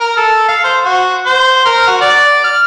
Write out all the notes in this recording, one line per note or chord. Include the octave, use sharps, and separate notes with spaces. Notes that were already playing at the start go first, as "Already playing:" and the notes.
A#4
A4
F5
C5
F#4
C5
A#4
F#4
D5
F6